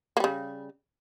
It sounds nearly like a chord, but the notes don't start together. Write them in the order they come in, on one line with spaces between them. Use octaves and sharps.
A#3 G3 C#3